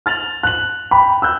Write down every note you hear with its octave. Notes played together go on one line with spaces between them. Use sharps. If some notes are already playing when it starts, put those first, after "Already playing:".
F6 A6 F7 F#7
F#6 F#7
G5 B5
E6 F#6 G6